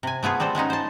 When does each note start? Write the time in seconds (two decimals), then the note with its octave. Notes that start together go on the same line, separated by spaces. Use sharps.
0.03 C3 G#5
0.23 A3 B3 F4 G#4
0.40 G3 C4 A4 C5
0.55 G#3 B3 C#4 D#4
0.70 C5 A5